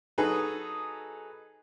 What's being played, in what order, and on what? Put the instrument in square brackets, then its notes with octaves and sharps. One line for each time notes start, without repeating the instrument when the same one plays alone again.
[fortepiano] F#3 D#4 F#4 G#4 A4 B4